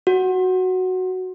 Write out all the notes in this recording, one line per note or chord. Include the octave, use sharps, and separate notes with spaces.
F#4